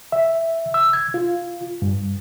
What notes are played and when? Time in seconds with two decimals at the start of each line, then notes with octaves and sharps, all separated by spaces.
0.12 E5
0.74 E6
0.93 G#6
1.14 F4
1.82 G2